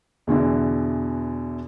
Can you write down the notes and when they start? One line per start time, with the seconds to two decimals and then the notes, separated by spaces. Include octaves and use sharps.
0.27 E2 B2 D3 E3